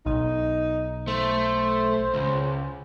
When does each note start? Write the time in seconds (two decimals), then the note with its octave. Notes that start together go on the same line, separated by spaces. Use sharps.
0.06 B1 D#4
1.08 A3 C5
2.14 C#2